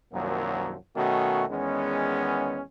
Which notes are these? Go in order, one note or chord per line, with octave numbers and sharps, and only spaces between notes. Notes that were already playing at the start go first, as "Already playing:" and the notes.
C2 F#2 D#3 F3 F#3 A#3
B2 D#3 A3 C#4 F#4
E2 D#3 G#3 B3 C#4